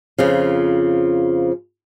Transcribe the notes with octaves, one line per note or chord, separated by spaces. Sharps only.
F2 C#3 F3